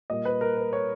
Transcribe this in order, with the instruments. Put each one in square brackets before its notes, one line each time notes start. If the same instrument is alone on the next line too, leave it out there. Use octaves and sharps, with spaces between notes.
[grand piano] A#2 G3 A#3 D#5
B4
A#4
B4
C#5